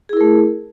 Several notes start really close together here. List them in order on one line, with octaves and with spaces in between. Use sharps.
G#4 E4 A#4 A3